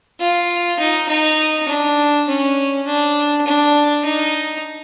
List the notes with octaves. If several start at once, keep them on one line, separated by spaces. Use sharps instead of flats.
F4
D#4
D#4
D4
C#4
D4
D4
D#4